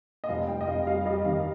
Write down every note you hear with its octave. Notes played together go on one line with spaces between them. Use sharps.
D#5
F1 F5
F1 G5
D#5
F1 F5
G3 F5
G3 D#5
D#3 F5